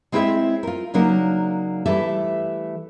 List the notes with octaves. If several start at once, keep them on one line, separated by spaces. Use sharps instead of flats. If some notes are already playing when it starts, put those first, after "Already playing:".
G#3 C4 E4 G#4 C#5 E5
F4 A#4
C#3 F#3 A#3 D4 D#4 A#4
E3 G3 A3 A4 E5